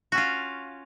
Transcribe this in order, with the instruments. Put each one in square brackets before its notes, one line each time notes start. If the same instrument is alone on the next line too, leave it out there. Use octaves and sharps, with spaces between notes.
[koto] F#4
C#4
F4